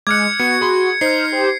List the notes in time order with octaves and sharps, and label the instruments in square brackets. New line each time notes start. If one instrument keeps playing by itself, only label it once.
[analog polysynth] G#3 [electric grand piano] D6 F6 F#6 [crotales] G#6 C#7
[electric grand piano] B3 [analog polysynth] F#4 [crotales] C#7
[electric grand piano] G#4 B5 C6
[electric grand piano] D#4 [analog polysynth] C5 F6 [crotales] C7
[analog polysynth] G4 C5